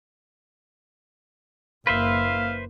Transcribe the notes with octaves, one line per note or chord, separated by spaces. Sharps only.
F#1 A#3 B4 C5 E5 F5